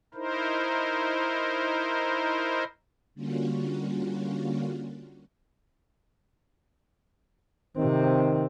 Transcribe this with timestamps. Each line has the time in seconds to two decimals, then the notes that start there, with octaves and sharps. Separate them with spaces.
0.14 D#4 E4 A#4 C5
3.15 D3 G3 A#3 C#4 F4 F#4
7.77 C3 D#3 C4